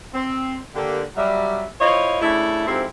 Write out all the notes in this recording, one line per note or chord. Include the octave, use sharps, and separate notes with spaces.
C4
D3 A#3 G4
F#3 G3 E5
E4 F4 C5 C#5 D#5
C#3 A3 D4 E4
F2 G#2 F3 C4 E4 G4